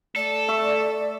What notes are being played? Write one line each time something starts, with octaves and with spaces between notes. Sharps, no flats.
A3 A4 D5
E5 C#6